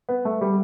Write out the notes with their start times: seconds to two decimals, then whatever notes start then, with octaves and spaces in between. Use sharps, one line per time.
0.09 B3
0.25 A3
0.41 G3